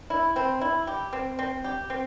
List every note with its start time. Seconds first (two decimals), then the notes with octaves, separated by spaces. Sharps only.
0.10 E4
0.36 C4
0.61 E4
0.87 G4
1.13 C4
1.39 C4
1.64 G4
1.90 C4